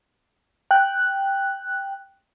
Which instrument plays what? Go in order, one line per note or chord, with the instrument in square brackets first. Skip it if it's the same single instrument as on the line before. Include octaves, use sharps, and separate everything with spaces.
[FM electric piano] G5 F#6